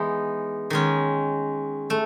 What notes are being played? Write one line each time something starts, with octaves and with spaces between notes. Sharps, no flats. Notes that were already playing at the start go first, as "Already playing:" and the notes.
Already playing: E3 G#3 B3 D#4
D#3 G#3 C#4
A3